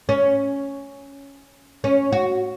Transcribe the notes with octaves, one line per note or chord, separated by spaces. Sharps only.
C#4
C#4
F#4